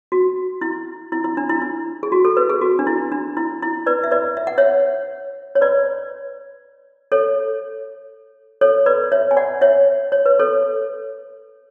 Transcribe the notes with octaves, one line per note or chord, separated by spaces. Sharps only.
F#4
E4
E4
E4
D4
E4
E4
G#4
F#4
A4
B4
G#4
F#4
D4
E4
D4
E4
E4
B4 D5
E5
B4 D5
E5
F#5
C#5 E5
C#5
B4 D5
A4 C#5
A4 C#5
B4 D5
C#5 E5
G#5
D5 F#5
C#5 E5
C#5
B4
A4 C#5